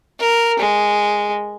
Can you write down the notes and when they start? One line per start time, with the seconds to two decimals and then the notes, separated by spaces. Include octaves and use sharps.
0.20 A#4
0.59 G#3